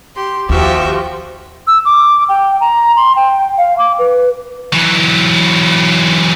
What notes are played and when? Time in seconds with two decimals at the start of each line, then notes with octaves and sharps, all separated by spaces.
0.16 G4 C6
0.49 D#2 F3 F#4 G4 E5 G5 C#6
1.67 E6
1.85 D6
2.29 G5
2.61 A#5
2.96 C6
3.16 G5
3.58 F5
3.78 D6
3.99 B4
4.73 E3 F#3